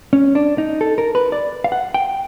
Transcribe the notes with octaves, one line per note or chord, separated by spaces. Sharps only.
C#4
D4
D#4
A4
A#4
B4
D5
F5
F#5
G5